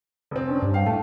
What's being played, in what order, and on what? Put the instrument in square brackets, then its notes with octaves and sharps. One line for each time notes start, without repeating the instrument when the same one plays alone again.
[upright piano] F1 C4
[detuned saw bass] C#4 [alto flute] D4
[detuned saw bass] G2
[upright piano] F5 [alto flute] G5
[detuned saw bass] A2 [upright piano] A3 [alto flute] A5